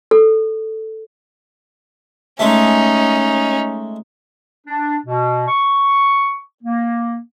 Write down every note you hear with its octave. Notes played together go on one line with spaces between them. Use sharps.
A4
G#3 A3 C#4 D#4
D4
B2
C#6
A#3